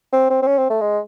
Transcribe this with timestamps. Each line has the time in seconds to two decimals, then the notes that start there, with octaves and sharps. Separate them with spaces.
0.13 C4
0.30 C4
0.42 C4
0.47 C#4
0.58 C4
0.70 A3
0.81 G#3